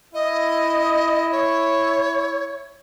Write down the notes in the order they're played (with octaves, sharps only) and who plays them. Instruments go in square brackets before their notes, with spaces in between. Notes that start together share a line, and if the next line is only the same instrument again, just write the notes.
[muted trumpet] E4 [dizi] D#5
[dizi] C#5